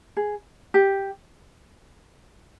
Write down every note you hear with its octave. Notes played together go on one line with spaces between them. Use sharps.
G#4
G4